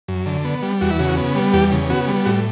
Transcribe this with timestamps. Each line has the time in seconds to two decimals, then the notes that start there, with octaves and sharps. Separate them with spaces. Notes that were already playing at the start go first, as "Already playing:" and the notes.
0.08 F#2
0.26 D3
0.45 B3
0.62 G3
0.81 E2 F#4
0.91 E4
0.99 C#3 F#4
1.17 B3
1.35 G3
1.53 E2 G4
1.72 C#3
1.90 B3 F#4
2.08 G3
2.26 A2 F#4